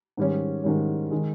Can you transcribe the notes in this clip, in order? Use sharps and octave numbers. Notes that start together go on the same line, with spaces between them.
G#2 D#3 G3 C#4
G#2 D#3 G3 C#4
D#3 G#3